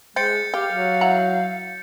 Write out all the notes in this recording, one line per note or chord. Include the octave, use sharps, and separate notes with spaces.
G#3 C5 G5 G6 A6 C#7
G4 F5 G5
F#3
E4 F#5 A#5